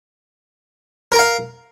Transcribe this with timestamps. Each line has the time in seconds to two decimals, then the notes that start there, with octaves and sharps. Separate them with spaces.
1.12 A#4
1.15 A#5
1.19 F5